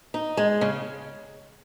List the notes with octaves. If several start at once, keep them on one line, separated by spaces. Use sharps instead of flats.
D#4
G#3
C#3